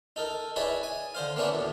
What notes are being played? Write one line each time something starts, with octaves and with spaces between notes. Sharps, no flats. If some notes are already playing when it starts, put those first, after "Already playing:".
D#4 A4 A#4
D#4 E4 G#4 B4 C#5 D5
G#5
D3 C5 F5
A#3 B3 C#4 D4 E4
D2 A2